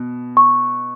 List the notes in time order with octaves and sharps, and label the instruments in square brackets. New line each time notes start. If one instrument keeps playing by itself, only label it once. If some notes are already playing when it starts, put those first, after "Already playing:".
Already playing: [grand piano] B2
[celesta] C#6